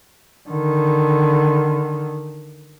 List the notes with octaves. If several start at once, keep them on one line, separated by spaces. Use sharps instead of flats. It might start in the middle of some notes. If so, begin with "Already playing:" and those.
D3 D#3